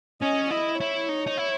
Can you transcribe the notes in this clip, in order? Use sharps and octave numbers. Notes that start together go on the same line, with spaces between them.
C#4 D#5
E4 D#5
E4 C#5
D#4
D#4
E4